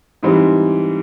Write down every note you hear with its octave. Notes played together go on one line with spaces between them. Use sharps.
G#2 E3 G3 C4